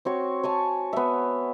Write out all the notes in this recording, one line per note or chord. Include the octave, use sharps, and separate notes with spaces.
C4 F#4 C#5
C#5 G#5 A5
B3 E5